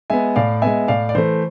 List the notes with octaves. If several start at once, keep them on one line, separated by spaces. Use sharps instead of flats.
G#3 B3 E5 G#5
A2 D5 F5
G#3 B3 E5 G#5
A2 D5 F5
D5
E3 A3 C5